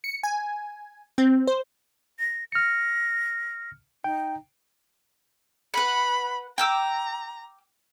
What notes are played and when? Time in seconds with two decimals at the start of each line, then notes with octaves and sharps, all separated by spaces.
0.04 C#7
0.23 G#5
1.18 C4
1.47 C5
2.19 A#6
2.52 F6 A#6 C#7
4.04 D#4 G5
5.74 B4 F#5 B5
6.58 G5 A#5 D6 E6